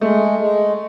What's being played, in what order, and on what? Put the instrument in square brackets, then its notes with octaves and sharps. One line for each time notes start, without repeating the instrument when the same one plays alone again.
[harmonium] G#3 [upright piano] A3
[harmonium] G#3